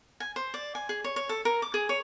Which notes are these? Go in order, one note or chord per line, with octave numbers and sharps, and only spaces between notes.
G#5
C5
D5
G#5
G#4
C#5
C#5
A4
A#4
D6
G#4
C#5